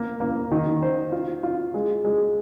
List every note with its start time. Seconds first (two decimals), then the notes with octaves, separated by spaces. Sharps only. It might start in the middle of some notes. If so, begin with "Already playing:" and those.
Already playing: A#3
0.20 A#3
0.52 D#3
0.82 C5
1.12 F4
1.43 F4
1.74 G#3
2.04 G#3